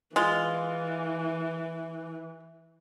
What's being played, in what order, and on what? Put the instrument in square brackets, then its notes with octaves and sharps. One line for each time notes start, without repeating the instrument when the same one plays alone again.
[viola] E3 [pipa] G#3 F4